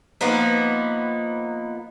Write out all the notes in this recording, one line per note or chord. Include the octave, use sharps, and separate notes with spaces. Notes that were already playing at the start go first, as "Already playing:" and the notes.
F3 A#3 B3 D#4